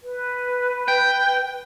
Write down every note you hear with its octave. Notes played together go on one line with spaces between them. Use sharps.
B4
G5